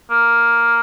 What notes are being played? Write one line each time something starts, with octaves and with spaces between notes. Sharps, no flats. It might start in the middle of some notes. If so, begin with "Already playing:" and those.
A#3